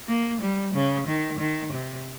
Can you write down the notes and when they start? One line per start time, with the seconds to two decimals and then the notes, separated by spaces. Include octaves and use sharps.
0.08 A#3
0.41 G3
0.74 C#3
1.07 D#3
1.39 D#3
1.72 C3